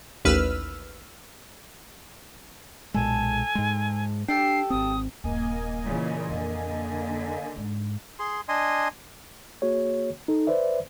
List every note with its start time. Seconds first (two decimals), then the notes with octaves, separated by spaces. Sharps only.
0.25 A1 D#2 B4 E6 F6
2.94 B1 A#2 G#3 A4 G#5
3.55 G#2 G#3
4.28 D4 G4 A4 G5 C7
4.70 G#1 C4 D#6
5.24 D#1 G2 A#3 D#5 G#5
5.86 A#2 C#3 E3
6.30 F2 D3
7.56 G#2
8.19 G#4 C6
8.49 D4 D#5 G#5 C6
9.62 A#3 F#4 G#4 C#5
10.28 D#4 A4
10.47 B4 C5 D5 E5